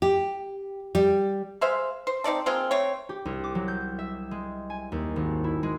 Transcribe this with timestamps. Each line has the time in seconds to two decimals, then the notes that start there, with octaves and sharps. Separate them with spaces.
0.02 G4
0.95 G3
1.61 G#3 C5 E5 F5
2.07 C5
2.24 C4 D#4 D5 A5
2.46 G#3 A#3 C4 F4
2.71 A3 C4 C#5
3.09 G4
3.25 C2
3.44 D6
3.55 F#3
3.68 G6
3.99 E5
4.31 G#3
4.70 G#5
4.92 D#2
5.16 G#1
5.44 E4
5.63 G#3